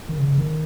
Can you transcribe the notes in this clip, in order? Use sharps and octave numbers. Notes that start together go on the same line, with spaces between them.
D#3
C#3
C#3
D#3